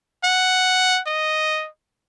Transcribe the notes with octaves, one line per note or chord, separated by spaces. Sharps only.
F#5
D#5